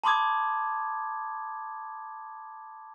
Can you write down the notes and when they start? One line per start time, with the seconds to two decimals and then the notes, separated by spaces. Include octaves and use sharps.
0.04 A5 B5 C6 D6 D#6 G#6